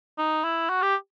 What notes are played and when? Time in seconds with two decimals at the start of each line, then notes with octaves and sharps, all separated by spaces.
0.18 D#4
0.44 E4
0.70 F#4
0.82 G4